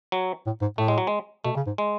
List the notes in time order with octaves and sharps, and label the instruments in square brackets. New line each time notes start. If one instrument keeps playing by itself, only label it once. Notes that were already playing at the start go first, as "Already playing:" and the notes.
[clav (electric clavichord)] F#3
[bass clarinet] A2
G#2
[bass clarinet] A2 [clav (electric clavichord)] A3
[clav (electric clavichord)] G#3
F#3
G#3
[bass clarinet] B2 [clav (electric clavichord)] A3
[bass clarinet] C#3
G#2
[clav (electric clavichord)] G#3